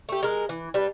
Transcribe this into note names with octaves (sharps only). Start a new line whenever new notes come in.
A3 G4
G#3 A#4
E3
G3 D4 B4